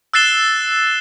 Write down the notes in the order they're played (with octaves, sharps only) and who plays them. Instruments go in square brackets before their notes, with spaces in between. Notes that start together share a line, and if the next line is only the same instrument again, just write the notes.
[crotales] E6 F#6 A6 C7 E7 G7